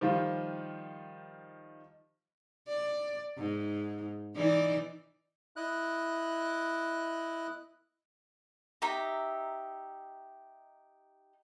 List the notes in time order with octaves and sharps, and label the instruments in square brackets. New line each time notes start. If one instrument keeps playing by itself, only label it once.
[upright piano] D#3 F3 G3 F4
[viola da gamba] D5
G#2
E3 D#4 D5
[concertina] E4 D#5 F#6
[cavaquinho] D#4 G4 E5 A#5